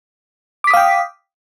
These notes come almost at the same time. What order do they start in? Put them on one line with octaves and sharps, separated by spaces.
D6 B6 D#6 F5 G5